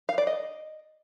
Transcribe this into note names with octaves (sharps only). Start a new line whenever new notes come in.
F5
D5
D#5